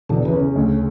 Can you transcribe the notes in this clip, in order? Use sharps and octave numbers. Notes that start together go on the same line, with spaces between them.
E2 B2 D3
C#3 E3
C#4
C#3
D2